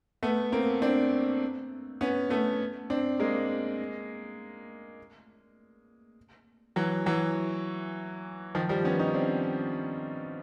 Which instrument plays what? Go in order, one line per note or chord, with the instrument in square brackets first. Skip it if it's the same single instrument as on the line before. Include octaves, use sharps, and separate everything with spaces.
[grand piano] A3 B3
A#3 C4
C4 D4
B3 C#4
A3 B3
C4 D4
G#3 A#3
E3 F#3
E3 F#3
D#3 F3
F3 G3
B3 C#4
C#4 D#4
C4 D4